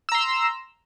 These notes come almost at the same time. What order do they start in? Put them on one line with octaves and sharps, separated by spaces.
E6 A#5 C6